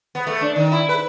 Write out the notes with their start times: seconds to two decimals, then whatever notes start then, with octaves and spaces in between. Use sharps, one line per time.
0.15 B3
0.27 A3
0.41 D4
0.56 D#3
0.72 E4
0.89 B4